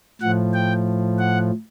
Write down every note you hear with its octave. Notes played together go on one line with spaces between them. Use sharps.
A2 F3 F#5
G5
F#5